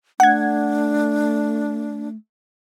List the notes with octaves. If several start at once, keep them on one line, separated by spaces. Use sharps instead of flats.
A3 D4 F#5 G#6